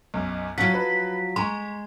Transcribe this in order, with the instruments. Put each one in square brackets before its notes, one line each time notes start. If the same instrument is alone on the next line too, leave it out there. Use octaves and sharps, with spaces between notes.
[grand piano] B1 F#2
[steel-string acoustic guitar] F3 F#3 [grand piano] F4 C#5 F#5 [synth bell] B6
[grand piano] B4
[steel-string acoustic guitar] G#3 [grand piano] A#5 C#6 [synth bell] C6